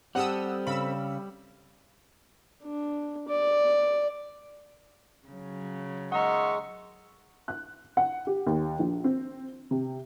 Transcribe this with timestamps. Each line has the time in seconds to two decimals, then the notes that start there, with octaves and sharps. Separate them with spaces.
0.15 G3 C4 G4 A4 F#5 D#6 E6
0.67 C#3 B5 E6
2.63 D4
3.28 D5
5.28 C#3 F#3
6.12 D#3 G#3 E5 F#5 A#5 C#6
7.48 F#6
7.97 F#5
8.27 G4
8.47 D#2
8.79 A#1
9.04 C4
9.71 C3